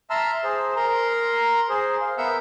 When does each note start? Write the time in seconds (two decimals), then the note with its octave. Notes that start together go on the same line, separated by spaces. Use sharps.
0.10 E5 A5 A#5 C6 E6 F6
0.44 G#4 C5
0.76 A#4 A#5 C6
1.69 G#4 C5
2.01 F5
2.18 B3 A#4 E5 F#5 E6 G6